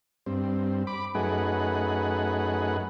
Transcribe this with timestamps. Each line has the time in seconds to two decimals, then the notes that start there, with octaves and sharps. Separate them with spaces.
0.26 G2 C4
0.87 B5 D6
1.15 F#2 A3 D#4 G#4 B4 F#5